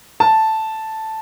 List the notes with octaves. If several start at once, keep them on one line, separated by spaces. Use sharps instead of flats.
A5